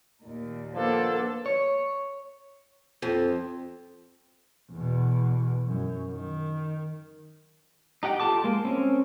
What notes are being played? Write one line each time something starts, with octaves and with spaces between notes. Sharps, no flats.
D#2 A#2
F3 A#3 B3 D4 A4
C#5
F2
E2 B2
F#2
D#3
D#4 G4 F#5 G5
F4 G4 A4 A5 D6
G#3 A#3
C4 C#4